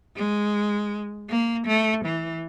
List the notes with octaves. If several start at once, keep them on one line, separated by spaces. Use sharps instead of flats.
G#3
A#3
A3
E3